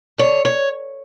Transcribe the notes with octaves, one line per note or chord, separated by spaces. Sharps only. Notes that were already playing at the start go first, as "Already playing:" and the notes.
D3 C#5
C#5